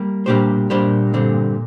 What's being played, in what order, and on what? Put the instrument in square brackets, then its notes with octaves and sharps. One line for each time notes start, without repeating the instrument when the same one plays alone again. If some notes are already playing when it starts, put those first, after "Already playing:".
Already playing: [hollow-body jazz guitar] G3 A#3
[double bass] A#2 [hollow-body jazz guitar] G3 A#3 D4 G4 C5
[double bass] A#2 [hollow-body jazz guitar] G3 A#3 D4 G4 C5
[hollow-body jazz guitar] G2 D3 G3 C4